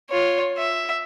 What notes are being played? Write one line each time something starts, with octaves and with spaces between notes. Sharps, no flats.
F4 C#5
E5